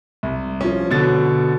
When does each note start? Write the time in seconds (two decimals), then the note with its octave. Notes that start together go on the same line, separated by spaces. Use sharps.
0.23 C2
0.61 F3 C#4
0.90 B2 D3 A6